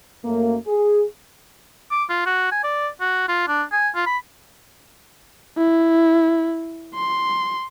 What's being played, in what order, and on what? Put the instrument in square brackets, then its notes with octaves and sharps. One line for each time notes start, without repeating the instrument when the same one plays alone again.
[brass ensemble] F#2 A3 A#3
G#4
[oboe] D6
F4
F#4
G#5
D5
F#4
F4
D4
G#5
F4
B5
[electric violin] E4
C6